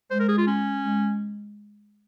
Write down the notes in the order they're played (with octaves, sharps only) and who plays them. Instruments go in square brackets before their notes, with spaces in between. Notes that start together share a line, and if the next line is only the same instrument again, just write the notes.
[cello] G#3 [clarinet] C5
[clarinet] A#4
G#4
F4
C#4
[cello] G#3